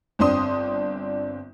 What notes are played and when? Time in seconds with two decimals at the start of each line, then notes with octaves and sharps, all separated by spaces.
0.19 G1 C4 D4 C6 D#6